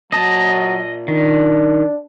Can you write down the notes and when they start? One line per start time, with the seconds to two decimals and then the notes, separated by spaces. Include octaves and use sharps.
0.12 A#2 F#3 D#5 A5
1.08 D#3 D4